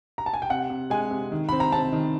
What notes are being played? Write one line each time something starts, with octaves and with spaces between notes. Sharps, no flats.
A#5
A5
G#5
G5
C3 F#5
C3
G#3 G#5
C3
D#3
C4 B5
A#5
C4 A5
D#3